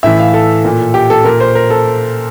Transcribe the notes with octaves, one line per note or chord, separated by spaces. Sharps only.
A2 E3 E5
F5
A4
A#2
G4
A4
A#2 A#4
C5
A#4
A4